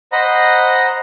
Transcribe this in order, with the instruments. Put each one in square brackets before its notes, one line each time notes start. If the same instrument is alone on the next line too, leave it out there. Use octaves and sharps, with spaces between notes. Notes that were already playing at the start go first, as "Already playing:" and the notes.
[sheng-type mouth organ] C5 D#5 F#5 A#5 B5